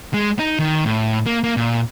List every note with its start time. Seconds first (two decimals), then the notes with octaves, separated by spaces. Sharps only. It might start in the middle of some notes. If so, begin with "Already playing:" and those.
0.14 G#3
0.39 D#4
0.59 D#3
0.85 A2
1.26 A#3
1.44 A#3
1.57 A#2